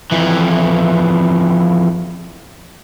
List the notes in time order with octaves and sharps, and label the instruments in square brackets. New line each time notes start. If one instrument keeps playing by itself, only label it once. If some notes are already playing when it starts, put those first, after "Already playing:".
[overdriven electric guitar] F2 E3